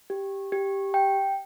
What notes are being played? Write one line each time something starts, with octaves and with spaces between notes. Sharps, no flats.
G4
G4
G5